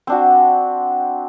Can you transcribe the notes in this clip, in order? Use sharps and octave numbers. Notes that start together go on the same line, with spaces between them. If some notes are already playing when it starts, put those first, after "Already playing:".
C4 D4 F#4